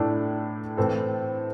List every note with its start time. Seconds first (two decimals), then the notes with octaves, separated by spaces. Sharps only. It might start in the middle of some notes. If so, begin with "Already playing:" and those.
Already playing: A2 A3 D4 A4
0.77 A2 E3 C4 A4